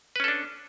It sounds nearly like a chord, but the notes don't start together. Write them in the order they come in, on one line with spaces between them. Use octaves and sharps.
B4 C#4 A4 D4